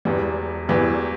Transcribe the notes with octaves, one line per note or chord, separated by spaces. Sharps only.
E1 E2 E3 G3
E1 E2 E3 G3